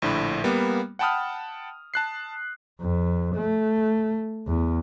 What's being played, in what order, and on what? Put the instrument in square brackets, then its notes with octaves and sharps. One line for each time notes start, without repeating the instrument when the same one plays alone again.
[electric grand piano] A#1 A2 D3 E4 B5
G3 A#3 B3
F#5 G5 A5 B5 D#6 F6
A5 F#6 C7
[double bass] F2
A3
E2